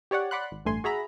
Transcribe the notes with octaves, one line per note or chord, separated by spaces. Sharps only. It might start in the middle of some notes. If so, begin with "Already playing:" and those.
G4 C#5 D5 F#5
D5 F#5 B5 C6 F#6
G#1
A1 G2 A3 G#5 C6
F#4 G#4 E5 A#5 B5